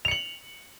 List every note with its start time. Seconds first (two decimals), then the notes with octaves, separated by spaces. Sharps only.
0.05 F7
0.08 C#7
0.11 F#7